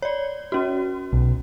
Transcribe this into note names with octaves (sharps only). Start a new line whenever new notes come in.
C#5 D5
C#4 F#4
B1